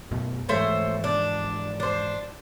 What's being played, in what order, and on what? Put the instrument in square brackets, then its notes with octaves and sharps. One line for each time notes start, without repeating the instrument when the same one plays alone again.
[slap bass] F#2 B2 A3
[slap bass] G#2 E3 F3 [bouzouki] A3 C5 C#5
[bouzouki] D4
D4 C5